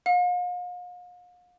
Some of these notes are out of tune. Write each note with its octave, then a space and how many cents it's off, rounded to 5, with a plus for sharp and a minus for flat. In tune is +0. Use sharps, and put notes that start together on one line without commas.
F5 +40